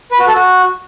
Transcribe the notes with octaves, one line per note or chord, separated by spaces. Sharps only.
B4
F#4
A4
F#4